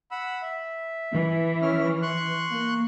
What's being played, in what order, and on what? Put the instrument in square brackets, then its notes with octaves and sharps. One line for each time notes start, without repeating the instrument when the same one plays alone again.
[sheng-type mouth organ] F#5 B5 E6
E5
[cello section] E3
[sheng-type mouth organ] C#4 E5 F6
C6 C#6 F#6
[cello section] A#3